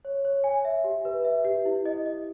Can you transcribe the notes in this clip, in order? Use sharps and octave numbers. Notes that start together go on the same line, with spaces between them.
C#5
C#5
G#5
E5
G4
B4
E5
G4
E4
D#5
D#5